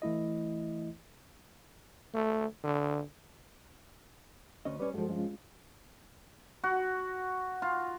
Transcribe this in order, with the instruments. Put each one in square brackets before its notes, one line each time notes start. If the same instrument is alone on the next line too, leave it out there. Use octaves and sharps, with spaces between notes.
[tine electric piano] E3 A3 E4 D#5
[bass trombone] A3
D3
[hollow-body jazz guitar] D2 C#4 D#5
[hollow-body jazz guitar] G3 C#4 [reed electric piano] B4 D5
[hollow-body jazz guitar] G2 F3 [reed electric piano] G#3 F#4 A4
[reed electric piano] G#3 C#4 F4
[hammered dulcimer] F#4
F4